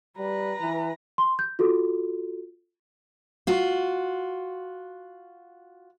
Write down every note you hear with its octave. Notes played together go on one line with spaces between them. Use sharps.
G3 B4 A#5
E3
C6
G6
F4 F#4 A4
F4 F#4